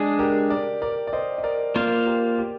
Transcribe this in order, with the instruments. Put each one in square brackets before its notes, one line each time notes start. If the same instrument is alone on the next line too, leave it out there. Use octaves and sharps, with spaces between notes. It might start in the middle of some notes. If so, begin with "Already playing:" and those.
Already playing: [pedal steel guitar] G#3 D4 G#4
[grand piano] G4 A#4
A#4 D5
A#4 D5
D5
C5 D#5
D#5
A#4 D5
[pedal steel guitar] A#3 F4 C5 F5 [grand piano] A#4 D5
[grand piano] G4 A#4
G4 A#4